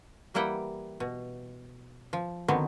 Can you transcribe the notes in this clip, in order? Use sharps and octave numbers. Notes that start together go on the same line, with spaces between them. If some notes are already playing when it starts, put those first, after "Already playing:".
E3 G3 A#3 E4 F#5 G5
B2
F3
D3 D#3 F#3 B3 C4